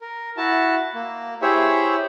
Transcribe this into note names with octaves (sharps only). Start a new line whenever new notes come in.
A#4
E4 F#4 A5
A#3
E4 G4 G#4 C5 C#5 E5